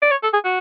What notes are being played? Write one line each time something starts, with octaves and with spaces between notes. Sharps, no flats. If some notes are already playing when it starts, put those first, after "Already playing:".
D5
C#5
A4
G#4
F#4